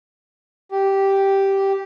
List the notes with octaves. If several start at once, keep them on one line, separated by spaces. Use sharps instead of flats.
G4